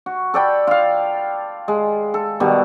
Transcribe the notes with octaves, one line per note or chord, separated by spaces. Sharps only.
F#4
A4 D5 G5 B5
F4 F5
G#3
A4
B2 D#3 G3